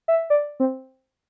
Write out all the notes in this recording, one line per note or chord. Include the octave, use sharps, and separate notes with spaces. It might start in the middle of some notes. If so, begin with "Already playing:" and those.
E5
D5
C4